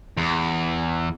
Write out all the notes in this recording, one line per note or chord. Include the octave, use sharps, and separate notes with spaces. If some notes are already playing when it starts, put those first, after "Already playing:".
E2